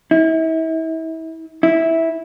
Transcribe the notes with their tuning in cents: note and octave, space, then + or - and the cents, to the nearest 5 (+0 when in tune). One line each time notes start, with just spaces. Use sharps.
E4 -35
E4 -10